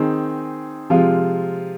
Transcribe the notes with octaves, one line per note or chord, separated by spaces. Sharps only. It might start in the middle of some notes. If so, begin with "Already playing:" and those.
Already playing: D#3 C4 D#4 G#4
C3 F3 G#3 F4